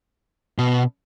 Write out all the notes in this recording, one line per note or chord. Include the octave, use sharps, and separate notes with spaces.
B2